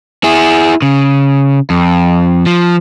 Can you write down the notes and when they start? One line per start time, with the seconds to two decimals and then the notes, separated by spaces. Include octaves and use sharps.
0.24 E4 G#4
0.82 C#3
1.70 F2
2.46 F3